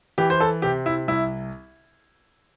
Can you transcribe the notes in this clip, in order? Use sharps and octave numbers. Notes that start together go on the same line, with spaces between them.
E3 G4
C5
A4
C3 G4
E4
C2 E4